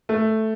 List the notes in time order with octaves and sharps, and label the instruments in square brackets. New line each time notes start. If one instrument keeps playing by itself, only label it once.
[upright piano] A3